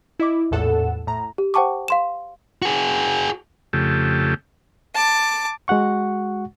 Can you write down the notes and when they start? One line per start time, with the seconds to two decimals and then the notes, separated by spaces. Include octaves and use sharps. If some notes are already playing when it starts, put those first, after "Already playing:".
0.19 E4 D#5 D6
0.51 A#1 E2 A2 A4 F#5 E7
1.07 A2 A#5
1.38 G4
1.54 C5 F#5 G5 A5 C#6 D6
1.88 F5 C6 E7
2.62 F#4 G#4
3.73 F2 C#3 A3 G4
4.94 A5 D6
5.68 G#3 F#4 F#5 C#6